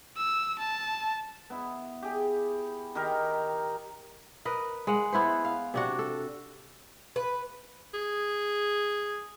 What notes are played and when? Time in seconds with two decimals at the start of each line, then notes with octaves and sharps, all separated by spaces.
0.17 E6
0.58 A5
1.50 B3 E4
2.02 G4 G#4
2.95 D#3 G4 A#4
4.45 A#4 B4 D#5
4.87 G#3 F#5
5.12 B3 E4 B4 C5
5.45 F5
5.74 C3 D4 F#4
5.99 A4
7.16 B4
7.94 G#4